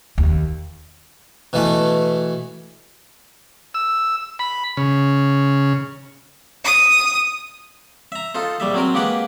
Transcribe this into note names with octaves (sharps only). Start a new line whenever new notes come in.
D#2
B2 E3 A3
E6
B5
C#3
D#6
E5 A#5
D#4 F4 A4 C5
A#1 G3 E5
F#3 C4 A#4
G#3 A#3 G4 B4 F#5 G5